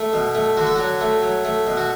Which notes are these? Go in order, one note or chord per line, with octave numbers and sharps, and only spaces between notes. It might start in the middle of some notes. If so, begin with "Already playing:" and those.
Already playing: A3
B2
A3
D3 F#4
A4
F#3 F#4
A3
F#3
A3
B2
F#4